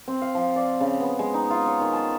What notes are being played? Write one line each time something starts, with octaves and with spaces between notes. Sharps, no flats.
C4
F5
F3
D5
C#3
B3
G#3
D#4
F4
C#5
D#3
A5